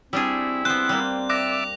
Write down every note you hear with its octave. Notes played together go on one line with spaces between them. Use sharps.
G3 C4 D4 E4 G#4
B3 C4 C5 F#6
G3 A#3
D5 E5 D6 F#6 A#6